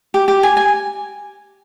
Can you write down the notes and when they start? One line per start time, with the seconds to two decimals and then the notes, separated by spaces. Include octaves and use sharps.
0.14 G4
0.28 G4
0.43 G#5
0.57 G#5